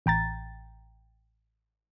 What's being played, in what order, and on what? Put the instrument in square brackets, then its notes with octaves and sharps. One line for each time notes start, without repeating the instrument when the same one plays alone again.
[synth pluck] A1 G5 A#5 A6